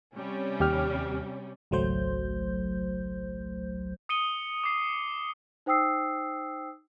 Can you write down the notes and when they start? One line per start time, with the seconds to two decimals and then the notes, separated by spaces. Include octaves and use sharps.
0.14 C3 G3 C#4
0.60 D#2 G4 F6
1.71 G#1 C#2 F#3 A3 C5 G6
4.09 D#6 C#7 D#7 G7
4.64 D6 C7
5.66 D#4 C5 G5 D#6 E6 C7